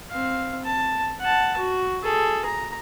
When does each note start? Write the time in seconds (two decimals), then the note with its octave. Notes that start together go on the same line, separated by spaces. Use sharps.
0.10 C4 F5
0.65 A5
1.20 F#5 A5
1.57 F#4
2.03 G#4 A4
2.45 A#5